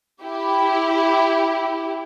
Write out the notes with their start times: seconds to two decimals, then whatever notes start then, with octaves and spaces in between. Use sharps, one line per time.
0.23 E4 G4